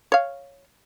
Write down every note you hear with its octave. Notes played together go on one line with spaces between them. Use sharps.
C#5 F5